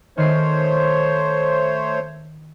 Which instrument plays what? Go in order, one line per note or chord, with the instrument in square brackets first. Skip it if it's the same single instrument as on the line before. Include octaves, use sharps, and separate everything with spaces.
[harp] D#3 C7 [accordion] A3 C5 C#5